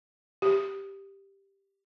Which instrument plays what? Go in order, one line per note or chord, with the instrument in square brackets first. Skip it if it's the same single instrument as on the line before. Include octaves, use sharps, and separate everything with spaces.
[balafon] G4